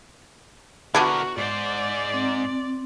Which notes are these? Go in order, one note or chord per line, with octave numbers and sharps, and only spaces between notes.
D3 B3 D4 E4 F#4 A#4
G#2 C5 D5
C4